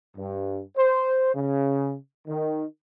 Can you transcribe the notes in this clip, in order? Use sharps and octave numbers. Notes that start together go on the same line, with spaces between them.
G2
C5
C#3
D#3